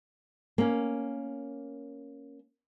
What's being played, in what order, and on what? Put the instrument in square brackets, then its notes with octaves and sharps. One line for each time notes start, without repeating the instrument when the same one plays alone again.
[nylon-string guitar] A#3 C#4